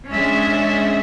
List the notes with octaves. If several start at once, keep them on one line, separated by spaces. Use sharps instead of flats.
G#3 C#4 D4 G#4 E5